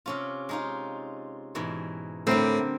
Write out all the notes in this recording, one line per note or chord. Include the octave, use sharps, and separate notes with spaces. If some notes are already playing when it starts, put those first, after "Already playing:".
C3 C#4 F4
G#3 D#4 F4
G#2 B2 E3
A2 D3 G3 C4 A#4